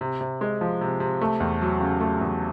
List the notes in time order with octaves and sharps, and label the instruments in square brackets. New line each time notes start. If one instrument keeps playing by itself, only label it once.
[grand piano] C3
C3
G#3
F3
C3
C3
A3
E2
F#3
C#3
A3
E2